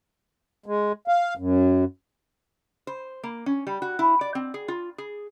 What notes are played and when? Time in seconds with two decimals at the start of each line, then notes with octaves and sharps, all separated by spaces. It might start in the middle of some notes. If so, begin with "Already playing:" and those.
0.66 G#3
1.08 F5
1.37 F#2
2.87 C5
3.24 A#3
3.46 C#4
3.67 G3
3.82 F#4
3.99 E4
4.21 D5
4.35 C4
4.54 G#4
4.68 F4
4.98 G#4